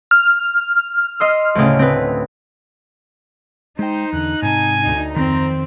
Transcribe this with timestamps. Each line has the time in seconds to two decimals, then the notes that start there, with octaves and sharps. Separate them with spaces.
0.11 F6
1.20 D#5 C6 E6
1.55 D2 A2 C#3
1.79 C4 B4
3.79 G#3 D#4 C5 G5
4.13 E2 D3 F#6
4.42 G#2 C3 G#5 A5
4.82 D2 D#4
5.16 F2 D#3 C4 A#5